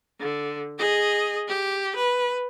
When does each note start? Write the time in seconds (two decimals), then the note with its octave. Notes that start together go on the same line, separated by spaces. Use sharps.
0.20 D3
0.79 G#4 D#5
1.48 G4
1.96 B4